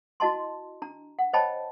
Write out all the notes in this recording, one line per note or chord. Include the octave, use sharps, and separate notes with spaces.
E4 F#4 D#5 A5 C6
D4 A#5
F#5
C5 C#5 D#5 G5 A5 B5